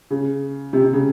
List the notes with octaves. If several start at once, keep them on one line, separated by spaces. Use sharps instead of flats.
C#3
C3
C3
C#3